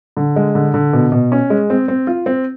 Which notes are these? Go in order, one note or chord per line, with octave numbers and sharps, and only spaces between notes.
D3
G#3
D3
D3
B2
B2
C#4
G#3
C4
C4
F4
C4